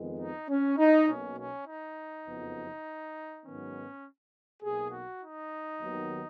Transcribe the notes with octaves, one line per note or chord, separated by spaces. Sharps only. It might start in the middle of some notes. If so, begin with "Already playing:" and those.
Already playing: F2 D#3 G#3 B3
D#4
C#4
D#4
B1 B2 A#3 C#4
C#4
D#4
F#1 F2 F3 B3
G#2 D#3 F#3 B3 C#4
B1 B2 A#3 G#4
F#4
D#4
D#2 D#3 F#3 B3